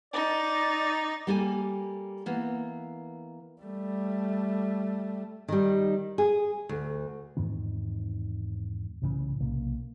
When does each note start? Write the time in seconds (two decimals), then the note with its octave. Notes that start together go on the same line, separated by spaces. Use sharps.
0.13 D#4 D5
1.27 G3 A#3 G4 A4 G5 G#5
2.26 E3 A#3 B3
3.62 G3 A3
5.48 D#3 G3
6.18 G#4
6.69 D2
7.37 E2 G#2 D#3 C4
9.02 C2 A2 C#3 E3
9.40 B1 C3 A#3